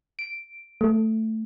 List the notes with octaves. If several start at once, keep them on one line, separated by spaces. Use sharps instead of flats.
D7
A3